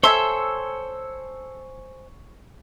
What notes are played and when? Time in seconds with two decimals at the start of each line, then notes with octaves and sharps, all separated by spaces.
0.03 A4 C5 C#5 E5 G#5 C6